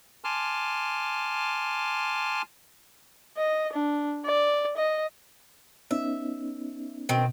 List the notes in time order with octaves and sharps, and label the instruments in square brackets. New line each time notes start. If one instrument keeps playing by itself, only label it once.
[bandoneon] G#5 A5 C6 D6 F6
[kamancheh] D#5
D4
D5
D#5
[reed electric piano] B3 C#4 D#4 [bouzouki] E5
[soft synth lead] B2 [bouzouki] D#3 C4